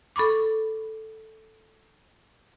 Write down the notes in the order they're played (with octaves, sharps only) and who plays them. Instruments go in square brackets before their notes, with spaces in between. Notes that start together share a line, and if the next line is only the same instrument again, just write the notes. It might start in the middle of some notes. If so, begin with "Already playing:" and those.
[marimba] A4 B5 C#6 D6